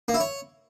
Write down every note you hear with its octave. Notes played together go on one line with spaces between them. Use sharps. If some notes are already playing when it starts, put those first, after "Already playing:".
A#3
E4
C#5